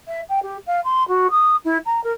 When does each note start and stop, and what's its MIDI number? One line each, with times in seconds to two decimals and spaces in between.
0.07 0.21 76
0.29 0.39 79
0.42 0.57 67
0.66 0.80 77
0.84 1.06 84
1.08 1.27 66
1.30 1.56 87
1.64 1.77 64
1.85 2.02 82
2.03 2.12 70